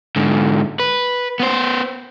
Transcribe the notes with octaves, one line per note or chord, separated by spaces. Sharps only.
G#2 D3
B4
B3 C5